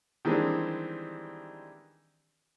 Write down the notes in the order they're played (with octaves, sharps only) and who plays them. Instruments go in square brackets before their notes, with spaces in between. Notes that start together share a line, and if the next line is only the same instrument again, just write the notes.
[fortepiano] D#3 E3 G3 G#3 C4 D4